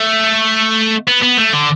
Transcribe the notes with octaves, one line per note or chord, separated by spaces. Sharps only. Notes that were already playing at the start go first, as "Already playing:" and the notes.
Already playing: A3
B3
B3
A3
D3